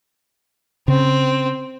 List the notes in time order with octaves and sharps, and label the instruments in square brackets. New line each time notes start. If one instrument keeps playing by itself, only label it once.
[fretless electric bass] C#3 [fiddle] C4